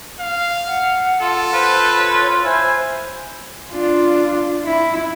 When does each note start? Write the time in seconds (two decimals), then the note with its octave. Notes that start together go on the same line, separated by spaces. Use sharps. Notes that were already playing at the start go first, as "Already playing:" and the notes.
0.20 F5
0.67 F#5
1.22 F4 A4
1.53 F4 B4 C5
1.97 C#5
2.45 E4 C5 G#5
3.72 D4 F4
4.66 E4